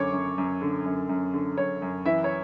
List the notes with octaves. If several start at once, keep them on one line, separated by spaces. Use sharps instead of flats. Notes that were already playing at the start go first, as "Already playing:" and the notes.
Already playing: F#2 D3 C#5 C#6 D6
F#2
F#2
D3
F#2
F#2
D3
F#2 C#5
F#2
E3 E4 E5
C#5